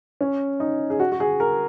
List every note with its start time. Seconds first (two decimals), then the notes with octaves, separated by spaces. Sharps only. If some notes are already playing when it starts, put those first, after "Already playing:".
0.21 C#4
0.60 D#4
0.90 G#4
1.00 F#4
1.12 F#4
1.20 G#4
1.40 A#4